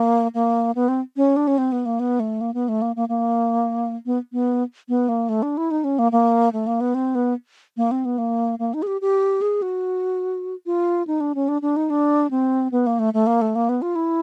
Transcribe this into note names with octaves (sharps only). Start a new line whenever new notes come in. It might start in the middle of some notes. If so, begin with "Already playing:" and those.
Already playing: A#3
A#3
B3
C4
C#4
D4
C#4
C4
B3
A#3
B3
A3
A#3
B3
A3
A#3
A#3
A#3
B3
B3
B3
A#3
A3
D4
E4
D#4
C#4
A#3
A#3
A3
A#3
B3
C4
B3
A#3
C4
B3
A#3
A#3
D#4
G#4
G4
G4
G#4
F#4
F4
D#4
D4
C#4
D4
D4
D#4
D4
C4
B3
A#3
A3
A3
A#3
A3
A#3
B3
F4
E4